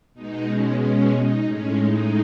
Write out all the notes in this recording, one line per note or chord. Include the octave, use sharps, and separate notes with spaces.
B2 G#3 D#4
C#4
C#4
D#4
A2 G#3 C#4
D#4